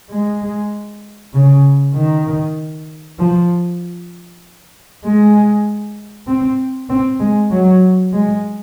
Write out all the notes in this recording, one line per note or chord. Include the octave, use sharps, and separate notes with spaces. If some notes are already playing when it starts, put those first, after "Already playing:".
G#3
C#3
D#3
F3
G#3
C4
C4
G#3
F#3
G#3